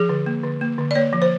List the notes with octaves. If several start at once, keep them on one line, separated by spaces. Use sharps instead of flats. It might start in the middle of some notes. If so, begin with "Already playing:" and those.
Already playing: F3 G#4
D3
A#3
D3
A#3
D3
D5
A#3 C#5
F3
C5